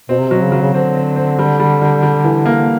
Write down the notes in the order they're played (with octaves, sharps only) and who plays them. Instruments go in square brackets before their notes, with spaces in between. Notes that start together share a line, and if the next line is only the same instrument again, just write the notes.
[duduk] B2 [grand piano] C4
[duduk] C3
[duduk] B2 [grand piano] F#3
[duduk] C#3
[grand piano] F#3
[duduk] C#3
[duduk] D3 [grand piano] C4
[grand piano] C4
C4
G3
G3
G3
G3
E3
A#3